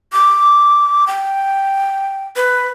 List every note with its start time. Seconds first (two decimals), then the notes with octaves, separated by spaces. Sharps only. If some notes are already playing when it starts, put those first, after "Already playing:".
0.13 D6
1.07 G5
2.36 B4